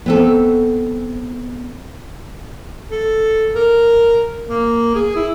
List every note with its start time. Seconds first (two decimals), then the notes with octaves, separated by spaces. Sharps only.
0.06 B3 C4 A4
2.91 A4
3.55 A#4
4.49 A#3
4.95 G#4
5.16 E4